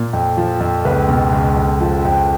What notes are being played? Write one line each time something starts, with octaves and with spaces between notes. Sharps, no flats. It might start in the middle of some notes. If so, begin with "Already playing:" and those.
Already playing: A#2 A#4
F2
F3
F2
C#2 B4
B2
C#2
F2
F3
F2